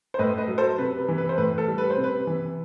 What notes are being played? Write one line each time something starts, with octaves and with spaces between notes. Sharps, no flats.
C5
A2 B4 D#5
B4 D#5
F#3
A4 C5
C3 B4
B4
E3
B4
C5
A2 B4
A4
G3
B4
C5
C3
B4
E3